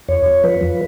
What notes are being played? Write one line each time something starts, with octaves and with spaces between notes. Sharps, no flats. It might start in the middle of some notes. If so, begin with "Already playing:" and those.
F2 C#5
F2
F3 B4
F3